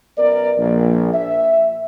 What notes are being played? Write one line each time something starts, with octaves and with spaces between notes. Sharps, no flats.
F#2 B3 A#4 D5
A#1
E5